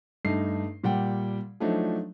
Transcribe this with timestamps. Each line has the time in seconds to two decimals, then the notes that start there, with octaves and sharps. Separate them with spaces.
0.25 G2 A3 D#4 C7
0.84 A#2 G3 F#5 G5
1.60 F3 F#3 A3 D4 D#4